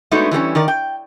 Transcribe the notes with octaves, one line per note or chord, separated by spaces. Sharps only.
G#3 A3 B3 D4 D#4 F#4
E3 G3 A3 C#4
D#3 A#4 D5
G5